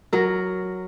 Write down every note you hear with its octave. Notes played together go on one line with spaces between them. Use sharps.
F#3 A#4